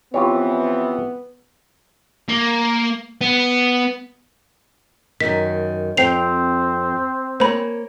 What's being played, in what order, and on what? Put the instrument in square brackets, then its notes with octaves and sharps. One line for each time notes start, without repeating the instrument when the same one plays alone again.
[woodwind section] E3 F3 C4 [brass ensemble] B3 [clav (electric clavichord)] F4 G4 C#5
[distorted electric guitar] A#3
B3
[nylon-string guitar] F#2 D#3 [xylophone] B6
[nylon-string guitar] F2 G5 [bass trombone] C4 [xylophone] C5 C7 F7
[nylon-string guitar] A#3 C#5 G#5 [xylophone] C5 B5